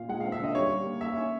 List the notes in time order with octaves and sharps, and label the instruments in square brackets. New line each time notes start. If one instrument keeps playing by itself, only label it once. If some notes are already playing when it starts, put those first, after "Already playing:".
Already playing: [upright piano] A#2 [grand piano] F5
[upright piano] G#3 [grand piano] F#5
[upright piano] C4 [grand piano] F5
[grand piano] E5
[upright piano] D3 [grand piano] D#5
[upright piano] G3 [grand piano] C#5
[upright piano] G3
A#3
[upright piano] A#3 [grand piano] E5
[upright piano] C#4